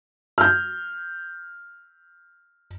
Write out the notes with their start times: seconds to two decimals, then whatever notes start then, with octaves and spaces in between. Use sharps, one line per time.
0.38 F6 G6